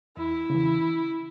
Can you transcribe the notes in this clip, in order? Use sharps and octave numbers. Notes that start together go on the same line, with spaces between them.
E2 E4
C#3 E3